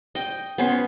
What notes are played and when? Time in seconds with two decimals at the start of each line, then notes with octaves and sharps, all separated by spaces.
0.15 D#5 G5
0.58 B3 C#4 C6